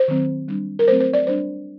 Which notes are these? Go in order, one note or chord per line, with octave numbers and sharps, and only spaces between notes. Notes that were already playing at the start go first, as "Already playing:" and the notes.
Already playing: C5
D#3 F#3 C4
G3 D4
A#4
F#3 A3 C4 C5
C5
D5
G3 D4 C5